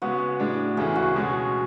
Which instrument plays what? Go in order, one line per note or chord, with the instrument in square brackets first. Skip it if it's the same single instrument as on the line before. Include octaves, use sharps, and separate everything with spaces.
[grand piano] C#3 G#3 B3 [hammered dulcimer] F#4
[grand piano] A2 G#3 D4
[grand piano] D2 C#3 E3 A3 [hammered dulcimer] G#4
[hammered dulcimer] F#4
[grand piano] B2 G#3 C#4